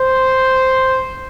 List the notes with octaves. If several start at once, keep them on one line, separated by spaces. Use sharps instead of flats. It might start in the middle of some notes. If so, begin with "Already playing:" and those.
Already playing: C5